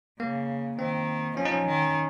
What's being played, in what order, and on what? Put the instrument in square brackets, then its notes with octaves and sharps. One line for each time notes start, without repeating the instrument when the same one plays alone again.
[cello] C#3 [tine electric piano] A#3
[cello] D#3 [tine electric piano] C4
[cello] F3 [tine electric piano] C#4
[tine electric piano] D#4
C#4
[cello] D#3